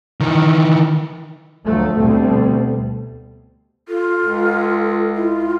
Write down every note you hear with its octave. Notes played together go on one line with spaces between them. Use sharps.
D#3 E3
D2 F3 F#3 A3 B3
D2 B2 D3 G3 A3 C4
F4 A4
C#2
E4 F4